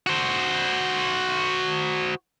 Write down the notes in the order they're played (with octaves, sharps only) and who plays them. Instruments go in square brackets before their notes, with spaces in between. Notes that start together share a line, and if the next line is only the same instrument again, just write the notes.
[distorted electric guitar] F#4 C5